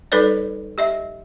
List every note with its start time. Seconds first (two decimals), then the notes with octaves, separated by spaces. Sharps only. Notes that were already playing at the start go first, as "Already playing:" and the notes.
0.12 G3 D#4 A4 B4 C#5 D5
0.78 G4 D#5 E5